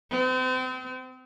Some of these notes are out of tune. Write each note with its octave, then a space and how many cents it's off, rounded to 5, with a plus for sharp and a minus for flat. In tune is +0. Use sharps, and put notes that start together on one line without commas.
C4 -35